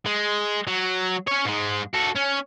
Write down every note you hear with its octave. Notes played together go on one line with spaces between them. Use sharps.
G#3
F#3
C#4 C#5
G#2 G#3
F#4 A4
C#4